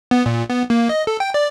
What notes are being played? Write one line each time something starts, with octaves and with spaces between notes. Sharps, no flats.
B3
A#2
B3
A#3
D#5
A4
G5
D5